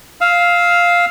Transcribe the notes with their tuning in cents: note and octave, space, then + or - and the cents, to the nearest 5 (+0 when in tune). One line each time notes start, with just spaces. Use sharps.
F5 +0 E6 -30